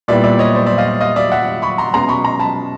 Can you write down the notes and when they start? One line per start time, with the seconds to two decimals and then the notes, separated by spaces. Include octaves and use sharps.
0.08 A#2 G3 B3 E4 G4 D5 E5
0.24 D5 E5
0.39 C#5 D#5
0.55 C5 D5
0.66 D5 E5
0.78 D#5 F5
1.01 D#5 F5
1.16 D5 E5
1.32 E5 F#5
1.62 B5 C#6
1.78 A#5 C6
1.94 B2 G#3 C#4 A#5 C6
2.09 B5 C#6
2.24 A#5 C6
2.40 A5 B5